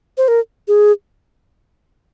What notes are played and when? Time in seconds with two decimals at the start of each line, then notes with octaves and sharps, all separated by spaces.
0.18 C5
0.28 A#4
0.68 G#4